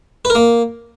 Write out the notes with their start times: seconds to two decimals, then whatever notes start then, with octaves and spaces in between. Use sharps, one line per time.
0.25 B4
0.30 A#4
0.35 A#3